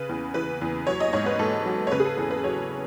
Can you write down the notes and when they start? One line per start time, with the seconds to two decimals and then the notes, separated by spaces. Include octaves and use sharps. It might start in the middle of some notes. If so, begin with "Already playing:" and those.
Already playing: C#3 B4
0.09 E2
0.34 E3 B4
0.61 E2
0.87 F#3 C#5
1.00 D#5
1.13 G#2 C#5
1.26 B4
1.39 G#2 A4
1.66 F#3
1.87 C#5
1.92 C#3 B4
2.00 G#4
2.05 A4
2.17 E2 A4
2.31 B4
2.44 F#3 C#5